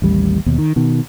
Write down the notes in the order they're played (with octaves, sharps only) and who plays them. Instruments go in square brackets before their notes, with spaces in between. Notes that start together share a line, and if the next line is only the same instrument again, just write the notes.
[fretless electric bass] A1 D#2 G3
D#2 B2
D#3
B2 D#3